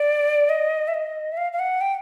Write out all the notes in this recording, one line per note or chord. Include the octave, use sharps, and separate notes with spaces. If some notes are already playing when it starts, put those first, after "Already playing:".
Already playing: D5
D#5
E5
D#5
E5
F5
F5
F#5
G5